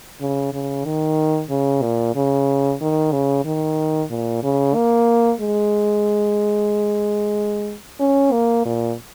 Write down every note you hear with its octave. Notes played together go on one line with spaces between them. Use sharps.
C#3
C#3
D#3
C#3
A#2
C#3
D#3
C#3
D#3
A#2
C#3
A#3
G#3
C#4
A#3
A#2